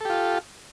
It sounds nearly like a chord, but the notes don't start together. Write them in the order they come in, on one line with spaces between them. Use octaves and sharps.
A4 G4 F4